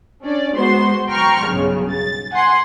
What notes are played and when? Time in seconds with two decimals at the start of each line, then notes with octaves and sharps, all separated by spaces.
0.23 C#4 D4 D5
0.56 G#3 B3 F#4 C5 C6
1.08 G5 A#5 C6 C#6 F6
1.48 B1 G2 C#3
1.91 A6
2.33 F#5 G#5 C6